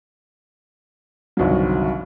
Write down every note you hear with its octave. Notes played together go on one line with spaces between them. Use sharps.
G1 C2 D#3 F#3